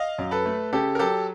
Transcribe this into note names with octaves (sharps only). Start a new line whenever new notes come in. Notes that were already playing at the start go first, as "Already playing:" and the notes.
Already playing: D#5 F5
F#2
A4 B4
A3
C#3 G4 A4
A#4
F#3 G4 A4